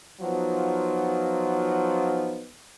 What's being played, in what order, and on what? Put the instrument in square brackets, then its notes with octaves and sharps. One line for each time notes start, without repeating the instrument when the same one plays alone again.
[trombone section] F3 F#3 B3 D#4 F4